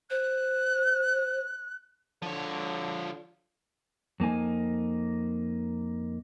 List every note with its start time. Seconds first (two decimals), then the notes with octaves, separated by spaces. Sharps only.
0.10 C5 F#6
2.22 D3 F3 C#5
4.20 F2 A#3 D#4 G#5